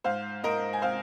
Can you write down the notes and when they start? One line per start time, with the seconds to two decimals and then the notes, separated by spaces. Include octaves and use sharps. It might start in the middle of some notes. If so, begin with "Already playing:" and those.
0.04 G#2 C5 F5
0.44 G#2 A#4 D#5
0.73 G#5
0.82 C4 C5 F5